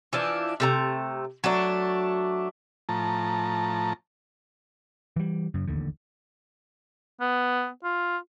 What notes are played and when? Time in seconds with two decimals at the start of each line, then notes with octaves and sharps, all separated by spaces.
0.13 E3 F3 D4
0.60 C3 A3 A#5
1.44 F#3 A3 D4
2.89 A2 F3 A5 A#5
5.16 E3 G3
5.54 F#2 C#3
5.67 D1 A1 D#2 D3
7.21 B3
7.84 F4